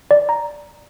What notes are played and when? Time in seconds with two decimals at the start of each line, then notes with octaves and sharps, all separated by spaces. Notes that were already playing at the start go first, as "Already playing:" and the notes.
0.11 D5
0.29 A#5